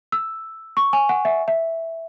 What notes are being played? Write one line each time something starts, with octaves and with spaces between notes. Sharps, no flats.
E6
C#6
G#5
F#5
E5
E5